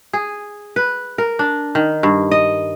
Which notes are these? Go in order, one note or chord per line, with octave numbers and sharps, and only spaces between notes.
G#4
B4
A#4
D4
D#3
G2
D#5